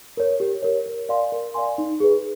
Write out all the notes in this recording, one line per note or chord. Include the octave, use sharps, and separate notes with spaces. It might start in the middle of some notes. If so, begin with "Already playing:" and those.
A#4 C#5
G4
A#4 C#5
A#4
D5 F5 G#5 C6
A#4
D5 F5 G#5 C6
D#4
G#4 B4